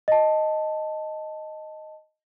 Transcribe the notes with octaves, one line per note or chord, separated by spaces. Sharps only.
D#5 A5